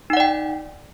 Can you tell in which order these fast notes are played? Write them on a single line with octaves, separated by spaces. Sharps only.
D#4 F#5 D5 G5